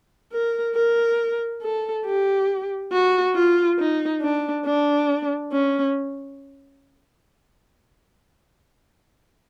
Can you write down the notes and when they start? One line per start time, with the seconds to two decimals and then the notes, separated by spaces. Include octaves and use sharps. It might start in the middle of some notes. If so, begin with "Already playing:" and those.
0.32 A#4
0.75 A#4
1.62 A4
2.05 G4
2.92 F#4
3.35 F4
3.79 D#4
4.22 D4
4.65 D4
5.52 C#4